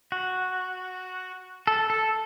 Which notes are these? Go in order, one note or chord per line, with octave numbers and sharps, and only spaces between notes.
F#4
A4
A4